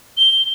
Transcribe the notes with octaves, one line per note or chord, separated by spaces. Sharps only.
G7